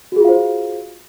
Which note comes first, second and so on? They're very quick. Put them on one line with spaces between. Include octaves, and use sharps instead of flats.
F#4 G#4 F4 F5 C5